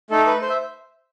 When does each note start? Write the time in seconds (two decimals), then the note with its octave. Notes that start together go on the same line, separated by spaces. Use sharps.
0.10 A3 D#4 A4
0.26 B4
0.42 C5
0.50 E5